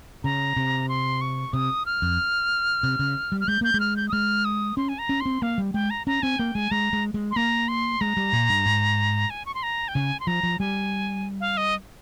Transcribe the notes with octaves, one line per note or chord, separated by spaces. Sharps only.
C#3 A#5
C3
C6
C#6
C3 D#6
F6
F2
C3
C#3
G3
F6
G#3 G6
A#3 G6
G#3
F6
G6
D#6
G#3 F6
D#6
C#4 C6
G#5
A#5
C#4
C6
C4
A#3 F5
G3
G#3 G5
A#5
C#4 A#5
C4 G#5
A#3 G5
G#3 G#5
G#3 A#5
G#3
G#3
C6
A#3 A#5
C6
G#3 A#5
G3
A#2
G2
G#2
G#5
C#6
C6
A#5
G5
C#3 G#5
C6
F3 A#5
F3
G3 G#5
F5
D#5